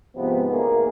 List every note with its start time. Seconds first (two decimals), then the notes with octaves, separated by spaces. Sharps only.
0.16 G#2 C3 F3 B3
0.51 D2 G#2 A#3 G#4 A#4